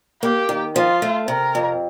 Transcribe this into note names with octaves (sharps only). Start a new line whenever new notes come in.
A#3 G4
D#3
F3 F4
A3
C3 A#4
F2